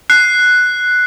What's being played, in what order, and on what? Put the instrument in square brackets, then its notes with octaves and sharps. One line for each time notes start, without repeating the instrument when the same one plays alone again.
[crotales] F#6 C7